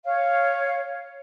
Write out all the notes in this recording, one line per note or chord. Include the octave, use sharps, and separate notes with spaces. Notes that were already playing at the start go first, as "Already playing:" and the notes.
C#5 F5